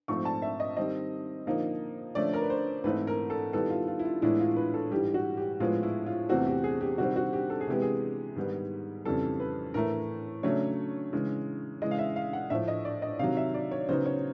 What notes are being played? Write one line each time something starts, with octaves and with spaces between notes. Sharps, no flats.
G#2 F3 A3 C4 C#6
A5
E5
D#5
D#3 G3 C4 D#5
D3 F3 A#3 D#4
D3 F3 A3 C#4 D5
A#4
B4
C5
G#2 E3 A3 C4 D#4 B4
A#4
A4
D#3 G3 B3 E4 A4
F4
F4
E4
F4
A2 E3 G#3 B3 D4 E4
F4
B4
A4
G#2 E3 G3 G4
F#4
G4
A2 F3 G#3 B3 E4 F4
E4
F4
E2 C3 E3 A3 C4 F#4
G4
G#4
G4
C3 D#3 G3 C4 F#4
F#4
G4
A4
G#4
C3 E3 G#3 B3 G4
G#4
G#2 D#3 G3 B3
F2 C#3 E3 G3 A4
B4
A2 E3 A3 A#4
C#3 F#3 A3 D4 C#5
C#3 E3 G#3
C#3 E3 G#3 D#5
F5
E5
F5
F#5
A2 F3 A3 E5
D#5
D5
D#5
C3 D#3 F#3 F5
E5
D5
C#5
C#3 F#3 B3 D#4 C5
C#5